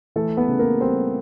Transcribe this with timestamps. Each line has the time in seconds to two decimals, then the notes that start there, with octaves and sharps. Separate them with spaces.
0.16 E3 A3 A4
0.37 B3 B4
0.48 C#3
0.59 A#3 A#4
0.81 G3 C4 C5